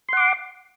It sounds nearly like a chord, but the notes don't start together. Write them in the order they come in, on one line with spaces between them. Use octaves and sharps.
C6 F#5 D6